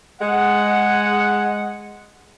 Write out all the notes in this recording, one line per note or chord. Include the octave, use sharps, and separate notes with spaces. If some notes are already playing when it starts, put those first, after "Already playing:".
G#3 F#5